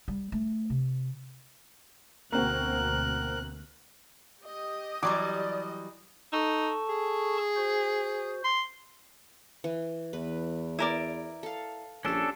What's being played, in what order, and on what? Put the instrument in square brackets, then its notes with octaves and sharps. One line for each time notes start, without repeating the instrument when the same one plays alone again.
[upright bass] G3
A3
C3
[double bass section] D2 B2 [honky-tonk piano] A#3 C4 F#4 [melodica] A#4 [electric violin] F#6
[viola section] G4 D#5
[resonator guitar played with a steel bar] E3 F#3 G3 [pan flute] D5 [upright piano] D6
[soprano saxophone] D#4 [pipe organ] A4 A5 C#6
[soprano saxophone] G#4
[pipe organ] F#4 C5
[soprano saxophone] C6
[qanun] E3
[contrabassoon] E2 [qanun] B4
[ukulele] E4 A#4 D5
[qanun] A4 F5
[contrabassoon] A#1 [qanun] G3 C6 [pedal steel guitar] C#4 D4 A4